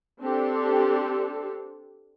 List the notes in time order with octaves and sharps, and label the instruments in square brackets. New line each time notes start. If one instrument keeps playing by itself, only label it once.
[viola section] C4 D4 G4 A4